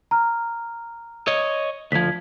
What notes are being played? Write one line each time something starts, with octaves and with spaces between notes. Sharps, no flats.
A#5 F6
C#5 D#5
D2 F3 G#6 B6